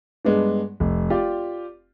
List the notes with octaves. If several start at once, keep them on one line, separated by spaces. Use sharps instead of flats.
G2 G#3 B3 D4
F1
F4 G4 D5